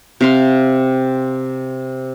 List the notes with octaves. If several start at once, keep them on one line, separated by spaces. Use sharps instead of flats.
C3 F5 C6